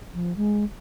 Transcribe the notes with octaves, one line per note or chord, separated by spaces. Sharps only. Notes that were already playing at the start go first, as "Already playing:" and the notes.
F3
G#3